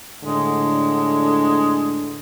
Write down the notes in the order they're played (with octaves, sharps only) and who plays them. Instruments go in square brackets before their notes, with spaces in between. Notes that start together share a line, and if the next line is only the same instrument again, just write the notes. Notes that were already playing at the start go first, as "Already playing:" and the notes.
[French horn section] A2 D3 [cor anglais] G#3